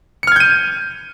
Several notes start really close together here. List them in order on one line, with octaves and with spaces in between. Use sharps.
C#7 F6 G#6 G6 D#7